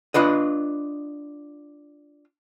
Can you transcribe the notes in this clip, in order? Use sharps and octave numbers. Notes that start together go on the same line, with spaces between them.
D4 F4 B4 D#5